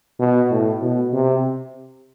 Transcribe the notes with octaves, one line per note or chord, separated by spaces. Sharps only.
B2
A2
B2
C3